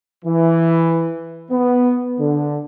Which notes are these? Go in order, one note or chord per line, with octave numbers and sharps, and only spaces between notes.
E3
B3
D3